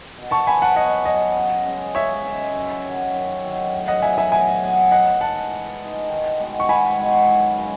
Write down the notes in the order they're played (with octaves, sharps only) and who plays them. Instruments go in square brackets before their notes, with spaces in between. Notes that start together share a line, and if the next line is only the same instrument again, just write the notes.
[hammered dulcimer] B2
[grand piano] A5 C#6
[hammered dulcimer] F#3 B3 [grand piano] G#5 B5
[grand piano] F#5 A5
[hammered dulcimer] B2 [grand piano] D#5 F#5
[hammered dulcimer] F#3 B3 [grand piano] D#5
[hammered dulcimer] C#3
G#3 C#4
[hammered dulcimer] C#3 [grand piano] C#5 E5
[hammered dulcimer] G#3 C#4
F#2
D#3 F#3
F#2
D#3 F#3
A2
[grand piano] D#5 F#5
[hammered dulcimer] F#3 B3 [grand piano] E5 G#5
[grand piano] E5 G#5
[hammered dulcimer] A2 [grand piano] E5 G#5
[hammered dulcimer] F#3 B3
[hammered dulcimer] E3 [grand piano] D#5 F#5
[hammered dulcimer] G#3 D#4 [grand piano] F#5 A5
[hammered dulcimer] E3
G#3 D#4
D#3
G#3 B3 F#4
[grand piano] C#6
[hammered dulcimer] D#3 [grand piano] G#5 B5
[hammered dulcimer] G#3 B3 F#4
F#2
C#3 G#3